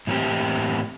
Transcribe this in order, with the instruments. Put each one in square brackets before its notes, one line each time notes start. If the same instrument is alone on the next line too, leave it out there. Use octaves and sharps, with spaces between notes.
[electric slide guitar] A2 E3 A#3 C4 G4